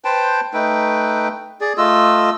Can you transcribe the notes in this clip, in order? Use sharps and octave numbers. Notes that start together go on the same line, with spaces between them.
B4 C5 G5 A5
A3 D#4 B4 G5
G#4 D5
A3 F4 D#5 E6